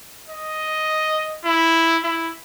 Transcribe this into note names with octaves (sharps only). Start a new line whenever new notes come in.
D#5
E4
E4